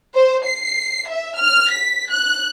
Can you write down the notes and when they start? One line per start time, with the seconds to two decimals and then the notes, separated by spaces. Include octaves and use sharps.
0.15 C5
0.45 C7
1.09 E5
1.38 F6
1.71 B6
2.11 F#6